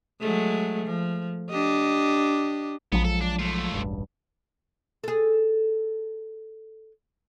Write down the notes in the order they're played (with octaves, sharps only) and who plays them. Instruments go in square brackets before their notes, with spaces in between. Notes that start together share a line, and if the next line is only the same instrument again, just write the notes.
[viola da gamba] F#3 G#3 A3
F3
D4 G4 D#5
[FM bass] A#1 [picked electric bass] F3 F#3 G#3 [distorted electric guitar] B3
[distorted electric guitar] A4
D4
A3 F4
[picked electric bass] E1 A1 G2
[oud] G#4 A4